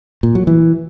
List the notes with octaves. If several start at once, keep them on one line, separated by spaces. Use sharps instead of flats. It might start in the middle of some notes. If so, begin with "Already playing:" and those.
A#2
F#3
E3